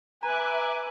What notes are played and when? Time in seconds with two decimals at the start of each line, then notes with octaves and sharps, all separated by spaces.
0.23 B4 E5 G#5 A#5 D6 F#6